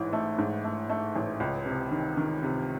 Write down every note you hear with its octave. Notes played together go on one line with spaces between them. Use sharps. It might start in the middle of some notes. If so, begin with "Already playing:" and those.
Already playing: A1 G#2 E3
A3
G#2
A3
A3
A1
C#2
C3
D#3
D#3
C3